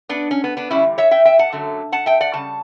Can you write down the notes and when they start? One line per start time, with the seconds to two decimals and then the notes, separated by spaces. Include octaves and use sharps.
0.09 B3 D4
0.31 C#4
0.44 B3
0.57 B3 D4
0.70 E2 D3 G3 C#4 E4
0.98 C#5 E5
1.11 E5 G5
1.25 E5 G5
1.39 F#5 A5
1.52 F#2 D3 F#3 A3
1.92 F#5 A5
2.06 E5 G5
2.21 D5 F#5
2.33 E2 C#3 G3 A5